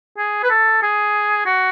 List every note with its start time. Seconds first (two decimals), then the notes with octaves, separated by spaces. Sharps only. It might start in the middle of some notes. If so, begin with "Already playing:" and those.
0.18 G#4
0.44 B4
0.50 A4
0.83 G#4
1.46 F#4